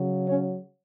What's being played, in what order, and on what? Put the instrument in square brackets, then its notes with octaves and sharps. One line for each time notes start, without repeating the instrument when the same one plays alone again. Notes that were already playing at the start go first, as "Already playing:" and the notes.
Already playing: [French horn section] C#3 F#3
C#4 C#5